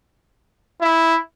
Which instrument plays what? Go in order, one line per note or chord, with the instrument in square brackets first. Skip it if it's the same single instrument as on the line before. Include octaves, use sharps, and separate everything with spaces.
[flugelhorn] E4